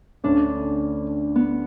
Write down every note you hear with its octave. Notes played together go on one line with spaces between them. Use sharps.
D2 D3 A3 C#4 D4
B3